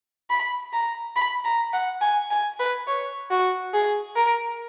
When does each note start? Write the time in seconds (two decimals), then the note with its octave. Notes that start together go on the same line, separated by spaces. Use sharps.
0.30 B5
0.73 A#5
1.16 B5
1.45 A#5
1.73 F#5
2.01 G#5
2.31 G#5
2.59 B4
2.87 C#5
3.30 F#4
3.74 G#4
4.16 A#4